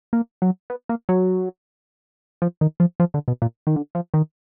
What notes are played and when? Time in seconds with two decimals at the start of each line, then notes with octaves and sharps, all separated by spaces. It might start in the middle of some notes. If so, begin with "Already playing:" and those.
0.13 A#3
0.42 F#3
0.70 B3
0.89 A#3
1.09 F#3
2.42 F3
2.61 D#3
2.80 F3
3.00 F3
3.14 D3
3.28 B2
3.42 A#2
3.67 D#3
3.76 D3
3.95 F3
4.14 D#3